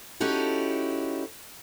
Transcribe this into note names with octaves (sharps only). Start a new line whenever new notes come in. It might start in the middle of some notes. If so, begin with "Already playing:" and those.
C#4 D#4 E4 F#4 G4 A4